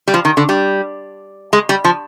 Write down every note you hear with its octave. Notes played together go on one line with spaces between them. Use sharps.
G3
F3
D#3
D3
G3
G#3
G3
F3